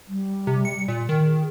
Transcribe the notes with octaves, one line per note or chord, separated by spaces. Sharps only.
G3
C3
C#7
A#2
D#3
G#4